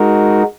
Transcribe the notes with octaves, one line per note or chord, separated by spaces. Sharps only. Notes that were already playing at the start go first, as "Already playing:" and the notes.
Already playing: G#3 D#4 F#4 A#4